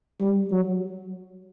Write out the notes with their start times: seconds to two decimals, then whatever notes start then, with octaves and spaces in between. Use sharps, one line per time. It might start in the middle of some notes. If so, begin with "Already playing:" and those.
0.20 G3
0.52 F#3